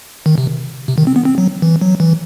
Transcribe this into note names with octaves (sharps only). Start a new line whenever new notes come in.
D#3
C3
C3
D#3
C4
B3
C4
F#3
E3
F#3
E3